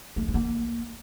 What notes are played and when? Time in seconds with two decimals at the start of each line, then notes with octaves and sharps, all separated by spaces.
0.16 A3
0.22 F3
0.28 G#3
0.34 A#3